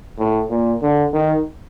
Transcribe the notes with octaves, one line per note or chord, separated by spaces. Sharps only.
A2
A#2
D3
D#3